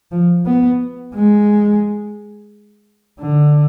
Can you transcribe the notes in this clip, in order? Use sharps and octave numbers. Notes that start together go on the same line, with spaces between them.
F3
B3
G#3
D3